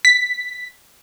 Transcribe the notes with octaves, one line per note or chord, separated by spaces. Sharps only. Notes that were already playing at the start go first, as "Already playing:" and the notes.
B6